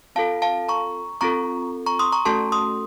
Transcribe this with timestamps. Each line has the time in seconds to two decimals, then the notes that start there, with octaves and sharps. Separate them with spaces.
0.15 C4 F4 A4 F5 A5
0.42 F5 A5
0.69 A#5 C#6
1.21 C4 F4 A4 A#5 C#6
1.86 A#5 C#6
1.99 C6 D#6
2.12 A#5 C#6
2.25 A3 C#4 F#4 A4 A5 C6
2.52 C6 D#6